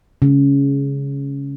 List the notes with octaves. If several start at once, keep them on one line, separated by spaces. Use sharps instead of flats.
C#3